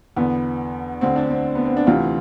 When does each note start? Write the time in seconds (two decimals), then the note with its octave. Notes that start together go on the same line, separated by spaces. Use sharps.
0.17 E2 D3 B3
1.01 D2 D3 C4
1.16 D4
1.30 C4
1.55 B3
1.65 C4
1.77 D4
1.87 D2 C3 E3 F4